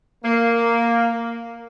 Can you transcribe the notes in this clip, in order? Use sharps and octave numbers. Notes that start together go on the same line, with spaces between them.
A#3